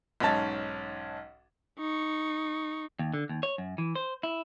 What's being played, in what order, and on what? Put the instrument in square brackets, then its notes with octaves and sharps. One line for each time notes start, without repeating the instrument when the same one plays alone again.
[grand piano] B1 G#2 C#4 A5 A6
[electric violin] D#4 C#6
[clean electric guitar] D#2
D3
D#2
C#5
F#2
E3
C5
E4